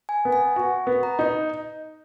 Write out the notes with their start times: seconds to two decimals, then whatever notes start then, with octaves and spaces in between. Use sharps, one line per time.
0.09 G#5
0.25 B3
0.32 G#5
0.56 F#4
0.87 B3
1.03 A#5
1.19 D#4